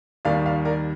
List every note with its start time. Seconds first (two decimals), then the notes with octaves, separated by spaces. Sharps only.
0.25 D#2 D#3 G3 D5 F5
0.46 D5 F5
0.65 A#4 D5